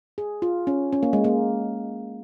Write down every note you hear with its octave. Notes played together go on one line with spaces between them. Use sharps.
G#4
F4
C#4
C#4
A#3
G#3
A#3